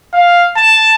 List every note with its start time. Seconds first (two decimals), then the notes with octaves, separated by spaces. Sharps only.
0.14 F5
0.57 A5